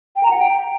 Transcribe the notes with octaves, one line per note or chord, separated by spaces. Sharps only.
G5
A#5
F#5
G5